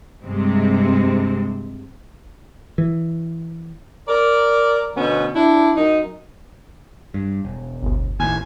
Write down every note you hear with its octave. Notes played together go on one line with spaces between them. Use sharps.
G2 C3 G#3 C4
E3
A#4 D5
D2 B2 B3 C#4
D4 E4
F#2 D#4
G2
E1
G1 D2
D#2 A2 G#5